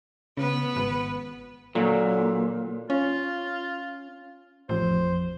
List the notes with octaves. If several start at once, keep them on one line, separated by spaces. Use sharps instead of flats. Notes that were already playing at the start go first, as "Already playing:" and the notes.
C#3 B3 B4
G#1
A#2 D3 F#3
C#4 F4
A1 F2 F3 C5